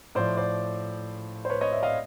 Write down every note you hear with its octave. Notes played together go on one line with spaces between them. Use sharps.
A2 F3 C5 D5
C5 D5
C5
B4 C#5
C#5 D#5
D5 E5
D#5 F5